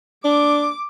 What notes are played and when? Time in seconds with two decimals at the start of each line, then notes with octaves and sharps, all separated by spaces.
0.25 D4 D6